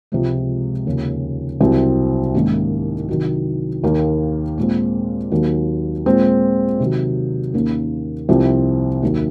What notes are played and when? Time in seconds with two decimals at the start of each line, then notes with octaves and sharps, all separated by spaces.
0.12 C#2 C3 F3 G#3
0.86 D#2 C#3 F3
1.60 C2 C3 F#3 C4
2.34 G#2 D#3 A#3 C#4
3.09 C3 D#3 F#3
3.84 D#2 D#3 A#3
4.58 A#2 G#3 C4
5.32 D#2 D#3 F#3
6.06 A#2 G#3 C4
6.80 C3 D#3 F#3
7.54 D#2 D#3 A#3 C#4
8.29 C2 C3 F3 C4
9.02 D#2 D#3 F#3